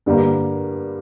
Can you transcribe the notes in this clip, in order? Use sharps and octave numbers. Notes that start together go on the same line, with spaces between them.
G2 D3 G3 A#3